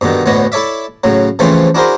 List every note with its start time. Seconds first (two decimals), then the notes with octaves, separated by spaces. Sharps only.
0.01 G2 B2 D3 D#3
0.26 D2 A2 D3 B3 C#5 D#5
0.52 E4 A4 C#5 D5 E5
1.04 A2 C#3 F#3
1.39 C#3 E3 F3 A3 C4 C#4
1.75 D4 E4 F#4 G#4 A#4 C5